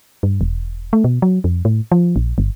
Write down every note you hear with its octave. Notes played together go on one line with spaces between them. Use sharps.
G2
E1
A3
B2
F#3
F2
A2
F3
A#1
G1